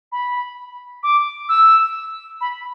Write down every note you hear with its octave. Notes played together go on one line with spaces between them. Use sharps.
B5
D6
E6
B5